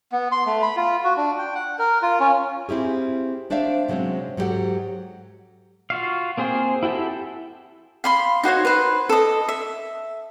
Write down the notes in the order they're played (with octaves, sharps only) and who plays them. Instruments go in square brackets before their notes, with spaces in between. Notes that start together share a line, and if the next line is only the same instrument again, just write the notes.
[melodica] B3
C6
A3
B5
F4
F#4
D4
G5
F#5
A#4
F4
C#4
[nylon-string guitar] C4 E4 G4 G#4
A3 D4 C5 D5 E5 F5
C3 F#3 G#3 C4 C#4
G#2 F#3 D4 G4 A4 F#5
[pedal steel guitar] F4 F#4 F5
A#3 C4 G#4 C5 G5
E4 F#4 G4 A4 E5
[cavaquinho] F5 B5 C6
D#4 F#4 C5 C#5
B4 C5
A4 D#5
E5